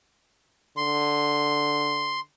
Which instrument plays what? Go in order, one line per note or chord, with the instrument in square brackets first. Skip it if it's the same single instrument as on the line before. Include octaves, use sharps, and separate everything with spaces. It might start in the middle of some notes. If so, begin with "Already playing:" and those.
[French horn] D3 [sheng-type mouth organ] C6